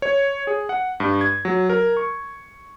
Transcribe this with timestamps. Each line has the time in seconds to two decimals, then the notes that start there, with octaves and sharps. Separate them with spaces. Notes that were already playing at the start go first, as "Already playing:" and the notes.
0.02 C#5
0.47 G#4
0.69 F#5
1.00 G2
1.21 G#6
1.45 F#3
1.70 A#4
1.97 C#6